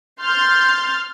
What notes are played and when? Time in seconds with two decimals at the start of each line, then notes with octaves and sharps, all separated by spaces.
0.22 C6 F6 G6 A6